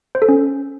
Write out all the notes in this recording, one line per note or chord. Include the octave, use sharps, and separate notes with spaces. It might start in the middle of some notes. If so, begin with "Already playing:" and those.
C5
A4
C#4